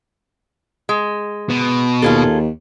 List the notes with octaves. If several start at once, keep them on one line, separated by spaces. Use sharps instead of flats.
G#3
B2
D#2 F4 G#4 A4